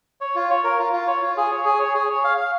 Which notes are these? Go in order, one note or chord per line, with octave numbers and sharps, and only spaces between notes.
C#5
F4
C#5
A#4
F4
F4
C#5
F4
G#4
C#5
G#4
C#5
G#4
C#5
F5
F5